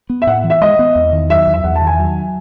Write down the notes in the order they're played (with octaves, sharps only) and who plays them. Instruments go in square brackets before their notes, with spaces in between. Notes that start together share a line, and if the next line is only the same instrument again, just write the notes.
[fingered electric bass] B3
[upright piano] E5
[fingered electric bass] A2 [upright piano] F#5
[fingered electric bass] E3
[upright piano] E5
[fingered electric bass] G#3 [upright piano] D#5
[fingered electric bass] B3
E2
D#3
[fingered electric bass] F#3 [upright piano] E5
[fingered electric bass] E2
[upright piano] E5
[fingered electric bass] E2 [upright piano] F#5
[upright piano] A5
[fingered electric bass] D#3
[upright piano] G#5
[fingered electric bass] F#3